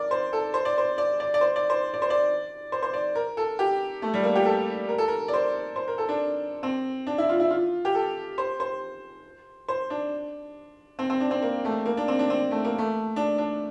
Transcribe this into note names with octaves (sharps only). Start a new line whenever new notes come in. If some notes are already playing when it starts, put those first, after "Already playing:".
Already playing: A#4 D5
C5
A4
C5
D5
C5
D5
D5
D5
C5
D5
C5
D5
C5
D5
C5
C5
D5
A#4
A4
G4
A3
G3
A#3
G4
A4
A#4
A4
A#4
D5
C5
C5
A#4
A4
D4
C4
D4
E4
F4
E4
F4
G4
A4
C5
C5
C5
D4
C4
C4
D4
C4
A#3
A3
A#3
D4
C4
D4
C4
A3
A#3
A3
D4
D4